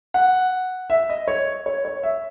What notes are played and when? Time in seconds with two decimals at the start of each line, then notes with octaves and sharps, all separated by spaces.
0.14 F#5
0.90 E5
1.10 D#5
1.28 C#5
1.66 C#5
1.85 C#5
2.03 E5